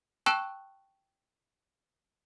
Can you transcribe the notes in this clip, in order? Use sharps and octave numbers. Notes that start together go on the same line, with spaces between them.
G5 A5 C#6 E6 F#6 E7